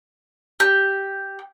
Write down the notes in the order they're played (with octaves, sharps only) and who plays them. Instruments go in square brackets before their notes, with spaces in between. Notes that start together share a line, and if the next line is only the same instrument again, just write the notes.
[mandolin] G4